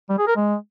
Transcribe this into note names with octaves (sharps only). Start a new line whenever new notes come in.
G3
G#4
A#4
G#3